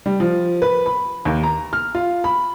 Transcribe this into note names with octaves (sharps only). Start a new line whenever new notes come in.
G3
F3
B4
B5
D#2
A#5
F6
F4
B5